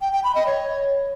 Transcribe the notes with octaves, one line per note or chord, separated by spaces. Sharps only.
G5
G5
B5
D#5
C#5